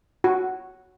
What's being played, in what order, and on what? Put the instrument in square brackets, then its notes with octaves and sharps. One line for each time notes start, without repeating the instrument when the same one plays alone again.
[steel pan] F#4